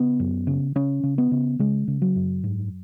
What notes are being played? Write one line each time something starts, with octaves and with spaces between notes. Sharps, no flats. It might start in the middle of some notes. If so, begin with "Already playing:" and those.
Already playing: C#3 B3
F#2
C#3
C#3 C#4
C#3
B3
C#3
C#3 G#3
C#3
F#3
F#2
G#2